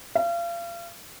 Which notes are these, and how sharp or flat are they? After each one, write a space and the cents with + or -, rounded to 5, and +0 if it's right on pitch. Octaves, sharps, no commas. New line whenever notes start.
F5 -35